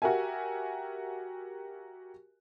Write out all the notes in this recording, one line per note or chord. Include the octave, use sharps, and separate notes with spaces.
F#4 G4 A#4 E5 G#5